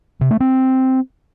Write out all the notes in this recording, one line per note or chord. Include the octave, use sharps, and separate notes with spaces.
C3
A3
C4